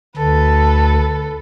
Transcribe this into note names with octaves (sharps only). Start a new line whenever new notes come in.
D2 A4 B4